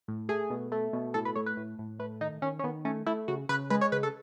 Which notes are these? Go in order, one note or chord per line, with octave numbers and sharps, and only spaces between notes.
A2
A3 G#4
B2
A3
B2
A2 A4
B4
A3 C#5
B4
A2
A2
A3 B4
D#3 D#4
D#3 C#4
C#4
D#3 B3
A3 C#4
A3 E4
C#3 F#4
C#3 B4
G#3 B4
C#5
C#3 B4
A4